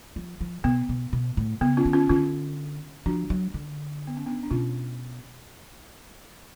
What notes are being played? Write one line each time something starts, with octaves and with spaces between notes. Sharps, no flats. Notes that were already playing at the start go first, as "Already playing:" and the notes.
F3
F3
B2 B3
B2
B2
A2
C#3 B3
C#4 F4
D3
C#4 F4
D3 C#4 F4
F3 D4 F#4
F#3
D3
B3
C#4
B3 D4
D4
B2 C#4 F4